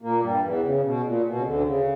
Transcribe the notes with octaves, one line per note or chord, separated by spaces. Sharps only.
A#2 A#3
G2 G3
E2 E3
C#3
B2
A#2
B2
C#3
D2 D3
C#3